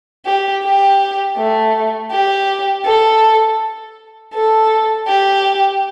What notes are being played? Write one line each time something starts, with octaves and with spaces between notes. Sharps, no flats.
G4
G4
A3
G4
A4
A4
G4